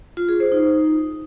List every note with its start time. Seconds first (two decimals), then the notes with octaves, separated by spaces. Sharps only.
0.17 F4
0.29 G#4
0.40 C5
0.52 D#4